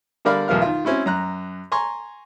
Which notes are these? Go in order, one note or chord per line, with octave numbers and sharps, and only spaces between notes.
D3 G3 A#4 D5 F5 B5
B1 E2 B2 A#4 F5 F6
D#3 F4
C4 C#4 E4 F#4
F#2 A#5 F#6
G#5 A#5 C6 C#6